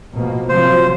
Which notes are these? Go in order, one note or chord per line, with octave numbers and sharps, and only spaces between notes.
B2 F3 A#3
C3 F3 F#3 C5